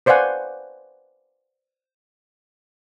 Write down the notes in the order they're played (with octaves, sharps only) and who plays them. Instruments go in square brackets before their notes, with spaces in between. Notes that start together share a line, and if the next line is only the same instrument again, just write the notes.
[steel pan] B4 C5 D5 F5 F#5 G#5